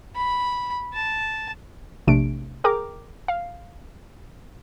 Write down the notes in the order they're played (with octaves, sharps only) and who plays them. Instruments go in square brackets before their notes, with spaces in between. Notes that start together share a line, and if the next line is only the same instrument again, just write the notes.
[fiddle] B5
A5
[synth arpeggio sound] A#1 C3 A3 D4 D7
G#4 A#4 G5 A#5 D6
F5